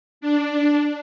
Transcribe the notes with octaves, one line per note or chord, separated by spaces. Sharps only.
D4